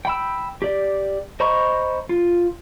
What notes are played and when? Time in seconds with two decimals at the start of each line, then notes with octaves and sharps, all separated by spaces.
0.05 G5 B5 E6
0.62 G4 D5
1.40 C5 D#5 A#5 B5 C#6
2.09 F4